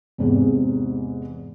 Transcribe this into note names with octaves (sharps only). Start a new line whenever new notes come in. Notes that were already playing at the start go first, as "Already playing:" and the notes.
E2 G#2 C3